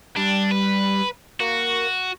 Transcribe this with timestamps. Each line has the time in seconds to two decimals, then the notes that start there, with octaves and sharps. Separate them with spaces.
0.17 G3 D4
0.51 B4
1.40 A#3 F#4